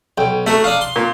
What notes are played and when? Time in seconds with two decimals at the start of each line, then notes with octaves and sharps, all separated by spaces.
0.18 B1 G5
0.46 A3 F#4 A#4
0.64 D4 D#4 F5
0.81 C6
0.96 A#2